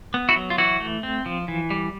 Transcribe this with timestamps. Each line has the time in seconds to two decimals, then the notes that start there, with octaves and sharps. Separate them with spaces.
0.14 B3
0.29 E4 F#4
0.36 F#3
0.50 F4
0.58 E3 E4 F#4
0.80 A3
1.03 C4
1.26 F3
1.48 E3
1.70 G3